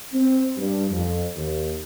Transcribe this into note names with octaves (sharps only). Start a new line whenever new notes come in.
C4
G2
F2
D#2